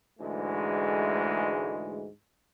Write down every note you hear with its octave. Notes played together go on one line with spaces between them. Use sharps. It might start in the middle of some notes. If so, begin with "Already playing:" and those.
D2 G#2 E3 G#3 A3